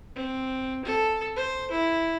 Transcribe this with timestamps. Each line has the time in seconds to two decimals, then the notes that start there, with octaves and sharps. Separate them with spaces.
0.16 C4
0.85 A4
1.36 C5
1.71 E4